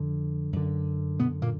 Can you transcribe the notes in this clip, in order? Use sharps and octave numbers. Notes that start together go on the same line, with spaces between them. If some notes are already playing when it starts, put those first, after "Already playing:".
Already playing: F2 D3
F#2 D3
B2 B3
A#2 A#3